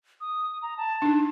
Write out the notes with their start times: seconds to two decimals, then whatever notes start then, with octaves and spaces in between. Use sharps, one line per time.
0.21 D#6
0.62 A#5
0.77 A5
1.02 D4 D#4